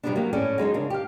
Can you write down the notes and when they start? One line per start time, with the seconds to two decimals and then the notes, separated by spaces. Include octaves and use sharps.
0.03 C3 E3 F#3 G3 B3 D4
0.16 F#3 A#3 B3 G4
0.33 A2 C#4 A4 D5 G#5
0.58 F#3 G#3 C4 D#4
0.74 C#3 D4 A#4
0.90 G4 F5